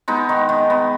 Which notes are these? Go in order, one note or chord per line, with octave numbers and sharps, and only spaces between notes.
G#3 B3 D#4
D#3
D#3
B3